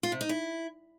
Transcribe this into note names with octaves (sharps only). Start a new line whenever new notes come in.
F4
C3
D#4
E4